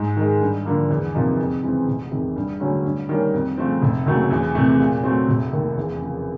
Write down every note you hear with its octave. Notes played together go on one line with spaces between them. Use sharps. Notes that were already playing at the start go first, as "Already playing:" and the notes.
Already playing: G#2
D#3 G#3
G2
D3 F3 A#3
E2
C3 F3 A#3 D#4
F2
C#3 E3 G#3 C4
F1
E2 C3 D#3
G2
D3 F#3 A3 C#4
G2
D#3 G3 A#3 C#4
F2
C#3 F3 A3 C4
F1
D#2 C#3 F#3 A3
E2
C3 E3 A3
A#2
F#3 A3 C4
F1
D#2 D#3
E2
C#3 F3